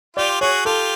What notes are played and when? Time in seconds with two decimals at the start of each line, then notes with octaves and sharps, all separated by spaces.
0.16 F4 G4 D5
0.41 F#4 G#4 C#5
0.65 F4 G4 A4